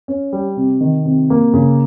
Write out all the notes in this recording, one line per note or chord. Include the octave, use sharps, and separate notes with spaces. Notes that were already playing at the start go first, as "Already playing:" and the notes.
C#4
G3
C3
D#3
C3
A#3
C#3